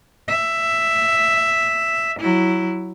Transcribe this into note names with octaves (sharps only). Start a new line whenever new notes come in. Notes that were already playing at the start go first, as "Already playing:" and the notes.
E5
F#3 E4